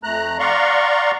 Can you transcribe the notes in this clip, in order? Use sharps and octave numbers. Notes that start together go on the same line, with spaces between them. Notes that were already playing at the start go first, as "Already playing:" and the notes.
F2 A3 A#5 F#6
D5 F5 F#5 A#5 C6 C#6